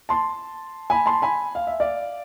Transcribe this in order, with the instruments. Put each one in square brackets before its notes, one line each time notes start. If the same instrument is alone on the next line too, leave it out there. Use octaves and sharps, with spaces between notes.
[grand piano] A5 C6
G#5 B5
A5 C6
G#5 B5
F5
E5
D5 F5